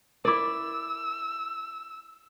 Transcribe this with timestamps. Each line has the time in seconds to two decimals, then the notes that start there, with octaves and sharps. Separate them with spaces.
0.25 E4 A#4 D5 D6 E6